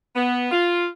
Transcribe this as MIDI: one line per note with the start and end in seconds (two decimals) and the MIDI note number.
0.15 0.47 59
0.51 0.85 65